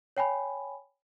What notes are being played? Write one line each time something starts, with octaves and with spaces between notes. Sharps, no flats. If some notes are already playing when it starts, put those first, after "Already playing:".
C#5 G5 G#5 B5